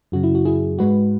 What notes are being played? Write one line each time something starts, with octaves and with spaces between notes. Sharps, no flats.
F#2 C#3 F#3 F#4
E4
F#4
E4 G#4
G#2 G#3 F#4 B4